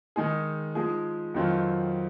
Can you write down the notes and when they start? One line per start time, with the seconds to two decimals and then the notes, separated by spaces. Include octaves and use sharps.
0.16 D#3 G#3 D#4 G#4
0.75 F3 G#3 D#4 G#4
1.34 F2 D#3 F#3 C4 F4